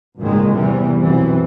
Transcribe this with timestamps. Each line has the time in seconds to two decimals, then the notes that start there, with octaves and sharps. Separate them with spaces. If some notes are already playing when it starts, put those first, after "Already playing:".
0.19 G#1 C#2 A#2 D#3 G#3
0.54 E2 C3 E3 G3
1.02 B1 F#2 E3 C4